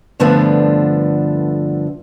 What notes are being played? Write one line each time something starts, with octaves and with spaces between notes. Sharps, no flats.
G2 D3 F3 A3 B3 D4